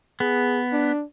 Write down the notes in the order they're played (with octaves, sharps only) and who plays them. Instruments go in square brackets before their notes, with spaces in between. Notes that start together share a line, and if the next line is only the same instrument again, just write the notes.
[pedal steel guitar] B3 [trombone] G#4
[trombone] D4